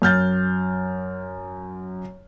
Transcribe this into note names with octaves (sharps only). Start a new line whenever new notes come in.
F#2 F6 G6 A6